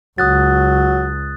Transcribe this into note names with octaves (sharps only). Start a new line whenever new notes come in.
C#2 F#3 D#6 F#6 A6